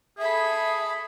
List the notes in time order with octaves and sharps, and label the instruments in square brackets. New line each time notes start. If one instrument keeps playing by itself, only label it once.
[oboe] G#4 [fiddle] A4 B5 [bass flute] E5